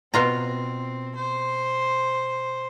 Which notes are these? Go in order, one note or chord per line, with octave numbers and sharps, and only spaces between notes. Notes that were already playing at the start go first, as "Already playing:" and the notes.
B2 C4 F4 A#5
C5